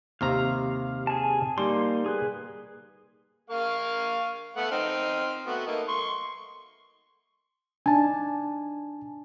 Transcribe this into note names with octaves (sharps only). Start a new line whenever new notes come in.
D#2 C3 F5 A#5
G#4 A5
G3 A#3 D#4 C6
G#4 B4
A#3 F5 C#6
A3 B3 F#5
C4 D#4 F6
A3 B3 F#4
A3 A#3 D#4
C6 C#6
D4 D#4 G#5 A5